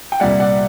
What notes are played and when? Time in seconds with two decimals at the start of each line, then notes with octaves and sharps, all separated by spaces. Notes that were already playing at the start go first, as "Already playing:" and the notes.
0.12 G5
0.20 C2 A#2 G3 D5 F#5
0.40 D5 F#5